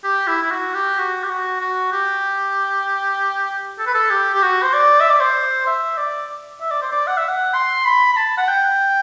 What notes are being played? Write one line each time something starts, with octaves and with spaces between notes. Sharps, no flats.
G4
E4
E4
F#4
G4
F#4
G4
F#4
F#4
G4
A4
B4
A4
G4
G4
F#4
C5
D5
E5
D5
C5
E5
D5
E5
D5
C5
D5
F#5
E5
F#5
C6
B5
B5
A5
F#5
G5